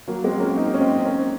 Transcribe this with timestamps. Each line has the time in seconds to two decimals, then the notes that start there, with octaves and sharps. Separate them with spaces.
0.08 F#3 A#3
0.24 G#3 C4
0.40 A#3 C#4
0.57 C4 D#4
0.74 C#4
0.81 C4 D#4
1.05 A#3 C#4